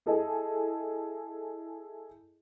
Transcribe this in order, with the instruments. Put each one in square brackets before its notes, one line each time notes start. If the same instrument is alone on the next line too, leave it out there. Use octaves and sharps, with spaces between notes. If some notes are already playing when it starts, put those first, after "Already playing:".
[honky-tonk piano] E4 G#4 A4 D#5